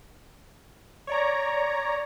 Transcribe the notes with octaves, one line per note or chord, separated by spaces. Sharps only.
C#5 D5 A#5